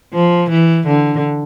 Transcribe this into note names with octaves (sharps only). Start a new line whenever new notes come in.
F3
E3
D3